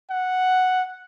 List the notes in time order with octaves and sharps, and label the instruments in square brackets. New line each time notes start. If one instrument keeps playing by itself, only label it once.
[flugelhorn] F#5